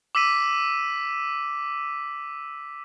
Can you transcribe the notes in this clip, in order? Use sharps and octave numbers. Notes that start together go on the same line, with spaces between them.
D6 E6 B6 D#7